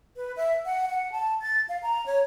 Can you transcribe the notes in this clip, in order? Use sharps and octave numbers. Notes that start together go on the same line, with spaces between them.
B4
E5
F#5
F#5
A5
A6
F5
A#5
C#5